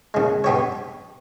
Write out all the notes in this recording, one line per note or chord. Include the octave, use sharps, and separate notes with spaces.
D#2 C#3 G#3
G2 G3 B3 G4 C#5